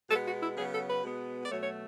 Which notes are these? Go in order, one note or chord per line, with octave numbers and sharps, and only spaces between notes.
B2 G#3 B3 A4
F#4
E4
C#3 F#3 B3 G#4
A4
B4
B2 G#3 B3
D5
B2 F#3 A3 C#5
C#5